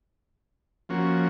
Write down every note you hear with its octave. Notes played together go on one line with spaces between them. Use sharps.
F3 A#3 C#4 F#4